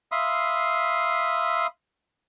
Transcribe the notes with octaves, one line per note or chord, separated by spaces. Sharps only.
E5 F5 B5 C6 D#6